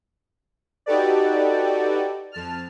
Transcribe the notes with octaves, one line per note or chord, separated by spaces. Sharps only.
D#4 F#4 G4 A4 B4 D5
F2 A5 F6